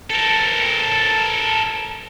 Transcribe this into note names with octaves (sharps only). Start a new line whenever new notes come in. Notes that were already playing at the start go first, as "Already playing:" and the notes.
A4 A#4